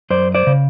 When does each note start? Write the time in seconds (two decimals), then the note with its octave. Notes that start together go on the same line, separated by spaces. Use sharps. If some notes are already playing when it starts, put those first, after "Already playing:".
0.10 F#2 C5 D5
0.35 C5 D5
0.47 C#3